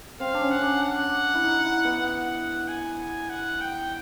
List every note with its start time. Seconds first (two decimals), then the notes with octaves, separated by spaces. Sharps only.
0.20 C4 F5
0.34 D4
0.41 C#4
0.51 F#5
0.62 D4
0.83 F#5
1.34 E4
1.44 D#4
1.64 E4
1.85 B3
2.07 F#5
2.69 G#5
3.30 F#5
3.61 G5